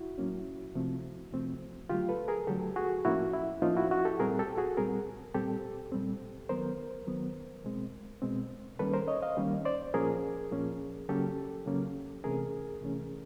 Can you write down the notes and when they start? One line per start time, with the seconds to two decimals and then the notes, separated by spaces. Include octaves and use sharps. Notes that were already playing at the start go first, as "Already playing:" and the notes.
Already playing: E4 F#4
0.18 A2 F#3 A#3 C#4
0.75 C3 F3 A3 C4
1.32 C3 F3 A3 C4
1.89 D3 F#3 A3 F4 G4
2.09 A4 B4
2.28 G#4 A#4
2.47 D3 F#3 A3 G4 A4
2.76 F#4 G#4
3.05 A2 F3 A#3 C#4 E4 F#4
3.33 E4
3.62 A2 F3 A#3 C#4 D#4 F4
3.76 E4 F#4
3.91 E4 F#4
4.05 G4 A4
4.19 A#2 G3 C4 G#4 A#4
4.39 G4 A4
4.58 F#4 G#4
4.77 A#2 G3 C4 G#4 A#4
5.34 A#2 G3 C4 G4 A4
5.92 A#2 G3 C4
6.49 D#3 F#3 B3 A#4 C5
7.07 D#3 F#3 B3
7.64 B2 G#3 C4
8.22 B2 G#3 C4
8.79 D#3 G3 A#3 C#4 A4 B4
8.94 A#4 C5
9.08 C#5 D#5
9.22 D#5 F5
9.37 D#3 G3 A#3 C#4
9.65 C5 D5
9.94 A#2 F3 A#3 C#4 G#4 A#4
10.52 A#2 F3 A#3 C#4
11.09 C#3 F#3 A#3 C#4 G4 A4
11.66 C#3 F#3 A#3 C#4
12.24 C3 E3 A3 C#4 G#4 A#4
12.81 C3 E3 A3 C#4